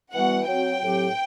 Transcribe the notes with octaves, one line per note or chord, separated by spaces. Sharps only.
E3 G3 B3 F#4 F#5
F#3 C4 F#4 G5
A2 F#3 C4 G4